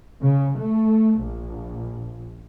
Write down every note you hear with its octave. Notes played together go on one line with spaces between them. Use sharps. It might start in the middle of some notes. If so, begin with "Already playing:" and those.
C#3
A3
A#1